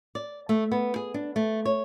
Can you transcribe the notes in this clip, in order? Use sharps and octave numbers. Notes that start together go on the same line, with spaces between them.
D5
A3
B3
G#4
D4
A3
C#5